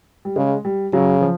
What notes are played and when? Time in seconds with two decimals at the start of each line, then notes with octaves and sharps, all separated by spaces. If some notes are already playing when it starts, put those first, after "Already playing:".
0.25 G3
0.36 C#3 G#3
0.65 G3
0.93 C#3 F#3
1.21 F3